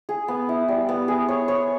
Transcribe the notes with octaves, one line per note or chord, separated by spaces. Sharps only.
G#4
B3
E4
G3
B3
G#4
C#5
C#5